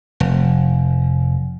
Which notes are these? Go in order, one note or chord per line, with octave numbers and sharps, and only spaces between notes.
F1